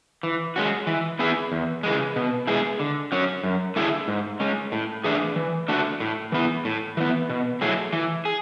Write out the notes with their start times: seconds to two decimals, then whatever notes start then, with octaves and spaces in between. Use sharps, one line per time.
0.23 E3
0.56 G#3 C#4 F#4
0.87 E3
1.19 B3 E4 G#4
1.52 E2
1.83 C#3 E3 G#3
2.16 B2
2.47 G#3 B3 E4 G#4
2.80 D3
3.12 F#3 C#4
3.43 F#2
3.76 D3 A3 E4 G#4
4.08 G#2
4.40 G#3 C#4
4.72 A2
5.04 E3 A3 D4 G#4
5.36 E3
5.68 A3 D4 F#4
6.00 A2
6.32 E3 B3 E4
6.65 A2
6.97 E3 B3
7.30 B2
7.61 F#3 A3 E4 G#4
7.93 E3
8.25 G#4